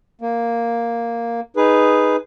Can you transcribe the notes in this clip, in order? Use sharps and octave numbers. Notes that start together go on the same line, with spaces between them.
A#3
D#4 G#4 B4